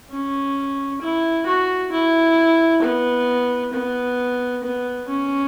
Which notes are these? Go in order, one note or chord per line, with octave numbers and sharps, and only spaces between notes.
C#4
E4
F#4
E4
B3
B3
B3
C#4